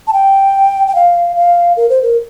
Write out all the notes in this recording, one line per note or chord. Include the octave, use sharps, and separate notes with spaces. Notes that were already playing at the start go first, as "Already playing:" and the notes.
A5
G5
G5
F5
F5
A#4
C5
A#4